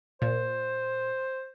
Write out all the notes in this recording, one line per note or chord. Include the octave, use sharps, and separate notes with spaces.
A#2 C5